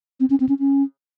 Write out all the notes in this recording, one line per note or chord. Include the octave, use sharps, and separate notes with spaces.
C4
C#4
C4
C#4
C#4